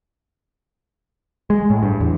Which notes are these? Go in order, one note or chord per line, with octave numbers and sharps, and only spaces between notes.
G#3
A2
G2
E2